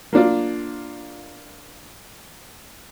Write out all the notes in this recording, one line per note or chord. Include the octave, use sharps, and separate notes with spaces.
A#3 D4 F4